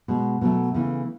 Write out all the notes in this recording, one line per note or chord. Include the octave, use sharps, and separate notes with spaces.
B2 G#3
B2 F#3 A3
C#3 E3 A3